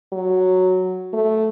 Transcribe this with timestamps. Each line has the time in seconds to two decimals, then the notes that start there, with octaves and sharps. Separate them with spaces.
0.13 F#3
1.13 A3